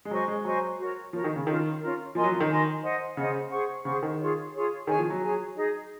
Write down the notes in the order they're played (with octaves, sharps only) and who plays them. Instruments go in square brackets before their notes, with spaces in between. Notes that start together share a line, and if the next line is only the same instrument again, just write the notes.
[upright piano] G#3
[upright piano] F#3 [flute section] C5 D#5 G#5 C#6
[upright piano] G#3
[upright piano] F#3 [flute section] C5 D#5 G#5 C#6
[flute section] F#4 A#4 C#5
[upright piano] F3 [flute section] F#4 A#4 C#5
[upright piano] D#3
C#3
[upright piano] D#3 [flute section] C#4 F4 A#4
[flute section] C#4 F4 A#4
[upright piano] F3 [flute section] A#4 D#5 G#5 C6
[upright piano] F#3
F3
D#3
[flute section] A#4 D#5 G#5 C6
C5 D#5 F#5
[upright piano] C#3 [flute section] C5 D#5 F#5
[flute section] G#4 C5 F#5 C#6
[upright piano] C#3 [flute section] G#4 C5 F#5 C#6
[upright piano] D#3
[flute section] F4 G#4 C#5
F4 G#4 C#5
[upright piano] D#3 [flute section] G#4 C#5 G#5
[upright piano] F3
F#3
[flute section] G#4 C#5 G#5
D#4 G#4 D#5